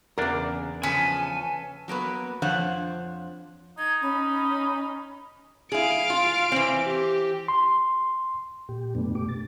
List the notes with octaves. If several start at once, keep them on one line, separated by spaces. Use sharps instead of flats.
E2 C#3 A#3 D4 A#4
C#3 F3 C#4 A4 B4 G#5
F#3 A#3 B3 B4
F2 F3 D4 C5 C#5 F#5
D#4 G#6
C#4 B5
E4 G#4 F5 D7
F4
E3 C4
G4
C6
A#2 G4
F#2 B2 A3 B3 D4
B2 A3 G4 D6
A6